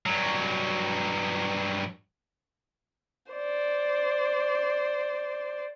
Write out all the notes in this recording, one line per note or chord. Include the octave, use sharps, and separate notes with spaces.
G2 F#3
C5 D5